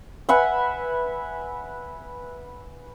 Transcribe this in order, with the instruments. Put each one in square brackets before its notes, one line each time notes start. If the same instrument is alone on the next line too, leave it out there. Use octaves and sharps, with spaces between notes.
[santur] B4 E5 F#5 G#5